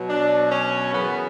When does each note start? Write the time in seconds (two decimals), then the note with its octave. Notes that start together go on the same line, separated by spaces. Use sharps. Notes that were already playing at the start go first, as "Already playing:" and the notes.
Already playing: B2 F#3
0.09 D4
0.51 C#4
0.93 F#2 C#3 E3 B3